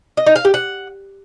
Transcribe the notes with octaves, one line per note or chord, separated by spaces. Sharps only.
D#5
D#4
F5
G4
F#5